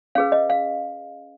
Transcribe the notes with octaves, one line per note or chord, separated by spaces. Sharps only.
C#4 G#4 B4 F5
D#5
F5